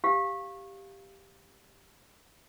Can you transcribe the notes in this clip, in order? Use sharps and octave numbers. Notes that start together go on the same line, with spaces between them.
G4 F5